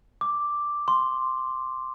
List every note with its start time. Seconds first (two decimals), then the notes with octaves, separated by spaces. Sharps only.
0.21 D6
0.88 C6